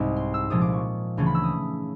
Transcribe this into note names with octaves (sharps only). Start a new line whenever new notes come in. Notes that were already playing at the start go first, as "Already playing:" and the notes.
Already playing: C2 G#2 G#3 C4 D#4
C6
E6
C2 A#2 F3 G#3 D#6
D6
C#6
D2 C#3 E3 A3 C#4 C6
B5
E6
D#6